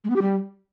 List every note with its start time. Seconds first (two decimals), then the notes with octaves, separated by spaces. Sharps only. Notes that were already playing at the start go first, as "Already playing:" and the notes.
0.04 G#3
0.10 B3
0.16 G4
0.22 G3